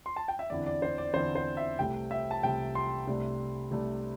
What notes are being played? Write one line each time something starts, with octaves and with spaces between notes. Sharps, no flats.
C6
A5
G5
E5
E2 D3 C4 E4 D5
D5
C5
D5
E2 D3 C4 E4 C5
C5
E5
C2 C3 A3 G5
E5
A5
C2 C3 A3 G5
C6
C2 C3 A3 D4
C2 C3 A3 D4